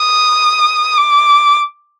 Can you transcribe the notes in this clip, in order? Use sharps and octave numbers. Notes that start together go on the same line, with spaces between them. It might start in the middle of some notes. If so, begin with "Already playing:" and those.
Already playing: D#6
D6